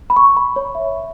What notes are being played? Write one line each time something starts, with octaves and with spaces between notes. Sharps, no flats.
B5
C#6
B5
C#5
E5